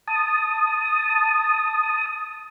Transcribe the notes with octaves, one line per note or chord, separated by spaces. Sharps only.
A5 D#6